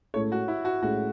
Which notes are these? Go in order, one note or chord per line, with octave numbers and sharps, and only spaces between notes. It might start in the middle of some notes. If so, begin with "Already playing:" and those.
A2 G#3 C#4 E4 A4 C#5
F#4
E4
F#4
A2 G#3 C#4 E4 F#4 A4